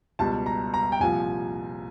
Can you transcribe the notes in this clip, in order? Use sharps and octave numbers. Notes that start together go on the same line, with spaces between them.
C#2 B2 G3 A5
A#5
A#5
G5
C2 A#2 F3 G#5